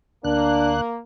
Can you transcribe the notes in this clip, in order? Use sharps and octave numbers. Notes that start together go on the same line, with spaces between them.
D2 A#3 D4 F#6